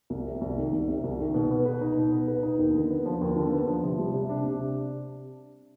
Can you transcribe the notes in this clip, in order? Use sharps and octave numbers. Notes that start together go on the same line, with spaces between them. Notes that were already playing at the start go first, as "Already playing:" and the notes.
C2
C3
C2
D#3
C2
C3
C2
D#3
B2
B3
B4
D#4
B2
B3
B4
D#4
D#2
D3
B3
F3
D#2
D3
B3
F3
C3
G3
C3
D4
C3